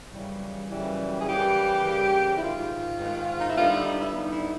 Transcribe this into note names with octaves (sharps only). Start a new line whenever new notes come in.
F#2 C#3 E3 G3
F#2 C#3 E3 G3
G#4
C#3 E3 G3 A#3 G4
C#3 E3 G3 A#3
E4
G#2 D#3 G#3 F4
G#2 D#3 G#3
D#4
E4
D3 G3 B3 D#4 F4
E4
D#4
E4
D3 G3 B3 D#4
E4